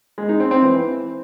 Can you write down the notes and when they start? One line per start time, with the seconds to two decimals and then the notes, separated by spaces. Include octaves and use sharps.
0.18 G#3
0.29 D#4
0.40 C4
0.51 C4
0.62 E3